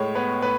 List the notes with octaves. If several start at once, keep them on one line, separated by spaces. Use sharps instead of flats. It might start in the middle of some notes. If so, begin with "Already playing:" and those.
Already playing: A2 G#3 C#5
B3 B4
A2 B4